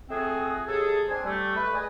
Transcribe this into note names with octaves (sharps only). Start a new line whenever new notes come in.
F2 A3 C4 F#4 G#4 D#6
D#2 G#4 A4
C4 D4 C5 G#5
G3 A3
A3 B4
G#4 B4 D5 D#5 G5 G#5